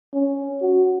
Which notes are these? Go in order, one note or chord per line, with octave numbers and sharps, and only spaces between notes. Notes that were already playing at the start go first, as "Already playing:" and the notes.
C#4
F#4